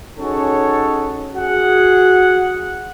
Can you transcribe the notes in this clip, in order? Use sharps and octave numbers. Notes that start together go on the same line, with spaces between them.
C#4 D#4 F#4 G#4 A4 C#5
F#4 G#4 F#5